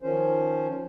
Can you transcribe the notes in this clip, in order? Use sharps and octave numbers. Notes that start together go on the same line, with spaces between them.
D#3 F3 C#4 C5